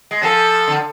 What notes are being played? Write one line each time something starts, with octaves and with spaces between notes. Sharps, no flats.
G#3
F3 A4
D3